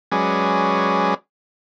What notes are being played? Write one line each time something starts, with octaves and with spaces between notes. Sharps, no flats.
F#3 G#3 C#4 G#4 B4 D5